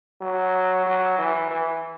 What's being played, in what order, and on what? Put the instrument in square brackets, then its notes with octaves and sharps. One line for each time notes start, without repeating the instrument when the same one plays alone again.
[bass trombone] F#3
F#3
E3
E3